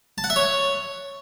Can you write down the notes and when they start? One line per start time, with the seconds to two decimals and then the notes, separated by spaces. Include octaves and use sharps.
0.18 A5
0.24 F#5
0.30 E5
0.36 C#5